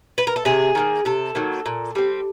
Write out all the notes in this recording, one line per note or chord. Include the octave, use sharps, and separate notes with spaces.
B4
A#4
A4
C3 G#4
D#3 F#3 A#3
C3 A4
D#3 F#3 A#3
A#2
G3 C4